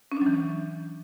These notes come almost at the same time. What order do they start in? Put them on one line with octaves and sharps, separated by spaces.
C#4 D4 F#3 E3